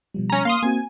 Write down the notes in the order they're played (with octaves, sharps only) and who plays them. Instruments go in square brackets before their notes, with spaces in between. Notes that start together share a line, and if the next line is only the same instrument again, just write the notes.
[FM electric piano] B2 F3 G3
[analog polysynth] C#4 A#5
[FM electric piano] A#3 [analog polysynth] F5 C6 D#6
[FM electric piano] A#3 C4 F#4 [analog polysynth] G#5